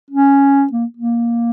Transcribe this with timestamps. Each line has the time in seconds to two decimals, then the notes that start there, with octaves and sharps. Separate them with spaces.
0.11 C#4
0.73 A#3
0.97 A#3